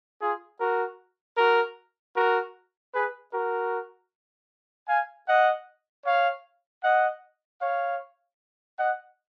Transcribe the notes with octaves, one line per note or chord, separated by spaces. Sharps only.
F4 G#4
F#4 A#4
F#4 A#4
F#4 A#4
G#4 B4
F#4 A#4
F5 G#5
D#5 F#5
C#5 F5
D#5 F#5
C#5 F5
D#5 F#5